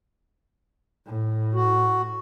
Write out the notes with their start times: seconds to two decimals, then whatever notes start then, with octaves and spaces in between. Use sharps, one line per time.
1.06 A2
1.54 F#4